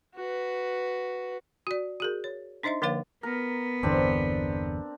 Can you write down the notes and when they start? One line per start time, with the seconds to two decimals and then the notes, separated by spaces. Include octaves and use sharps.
0.15 F#4 B4
1.67 F#4 D5
2.00 F#4 G#4 A#4
2.24 C#5
2.63 D4 D#4 C5 D#5 E5 C6
2.82 D3 F3 A#3 B4 C#5 F5
3.23 B3 A#4
3.83 G1 E2 D3 C4 D4